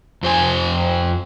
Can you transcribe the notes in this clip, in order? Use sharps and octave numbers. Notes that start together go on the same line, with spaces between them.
F2 C5 G#5